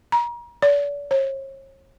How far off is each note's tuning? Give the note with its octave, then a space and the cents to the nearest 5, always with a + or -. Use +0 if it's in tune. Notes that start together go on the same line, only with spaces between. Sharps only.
A#5 +35
D5 -40
C#5 -45